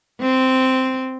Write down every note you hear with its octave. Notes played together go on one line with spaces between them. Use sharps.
C4